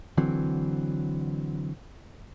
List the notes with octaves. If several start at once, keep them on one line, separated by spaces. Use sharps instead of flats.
D3 E3 F#3 C4